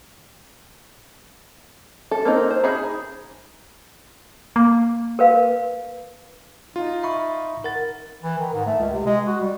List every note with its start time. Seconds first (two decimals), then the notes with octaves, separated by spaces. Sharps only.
2.11 A4
2.25 A#3 C4 D#4
2.50 C5
2.64 D#4 G#4 B5
4.56 A#3
5.19 A#4 B4 F5
6.76 D#4 F4
7.03 E5 B5 C#6
7.64 A#4 F#5 A6
8.22 E3
8.38 D#3
8.54 G#2
8.66 A3
8.79 C#2
8.93 C3
9.06 G#3
9.26 F#4
9.40 G3